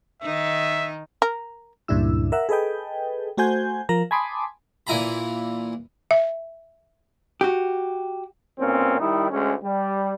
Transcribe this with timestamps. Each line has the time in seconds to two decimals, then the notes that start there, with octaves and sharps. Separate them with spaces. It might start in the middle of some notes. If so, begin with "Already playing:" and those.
0.22 D#3 D#4 E5
1.22 A#4
1.88 C#2 G2 A#2 D4 E4 E6
2.32 A#4 E5 F#5
2.49 G#4 A4 B4 D#5 G5
3.37 A3 F#4 C5 G#5 G6
3.89 F3 A#4 A#5
4.11 G#5 A5 B5 C6 D6 D#6
4.87 A#2 E3 E4 G#5 A#5 B5
6.11 E5
7.41 F#4 G4
8.59 B1 A#2 C4 C#4
9.00 D#3 G3 D#4 E4
9.30 D2 G#3 C#4
9.63 G3